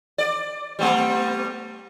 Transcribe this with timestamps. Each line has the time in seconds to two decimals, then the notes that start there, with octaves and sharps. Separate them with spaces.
0.18 D5
0.79 G3 A3 B3